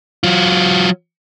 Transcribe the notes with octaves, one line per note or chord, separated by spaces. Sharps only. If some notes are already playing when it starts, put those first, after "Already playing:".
F#3 F4